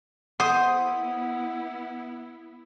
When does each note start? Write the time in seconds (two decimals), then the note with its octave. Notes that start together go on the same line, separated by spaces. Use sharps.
0.40 B3 E4 C5 F#5 D#6